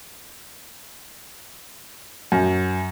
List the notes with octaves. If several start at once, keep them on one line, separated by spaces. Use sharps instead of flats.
F#2